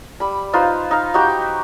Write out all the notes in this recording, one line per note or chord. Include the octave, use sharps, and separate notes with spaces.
G3 B5
D#4 F4 B4 C5
D#4 F5
D#4 F#4 G4 G5